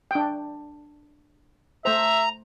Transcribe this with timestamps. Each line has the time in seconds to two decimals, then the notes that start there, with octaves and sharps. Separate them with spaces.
0.11 D4 G5
1.85 A3 C5 E5 A#5